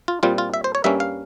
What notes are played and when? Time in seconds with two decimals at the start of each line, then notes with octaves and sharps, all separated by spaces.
0.08 F4
0.23 A#2 G3 C4 F4
0.38 F4
0.54 E5
0.64 C5
0.75 C#5
0.84 G2 G3 A#3 C#4 E5
1.00 F5